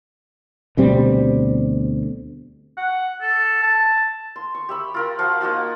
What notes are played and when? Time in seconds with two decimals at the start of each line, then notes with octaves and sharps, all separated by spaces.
0.77 D2 B2 G3 C4
2.77 F#5
3.21 A4
3.62 A5
4.36 C6
4.55 C#6
4.69 G4 E5 B5
4.94 F4 A#4 B5
5.19 F3 F#4 F5
5.41 A#3 D#4 F4 F#4